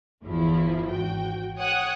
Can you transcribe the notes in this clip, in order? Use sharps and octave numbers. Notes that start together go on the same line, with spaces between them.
G1 E2 F3 E4
G#1 F#4 G5
C#5 F#5 G5 D#6 F#6 G#6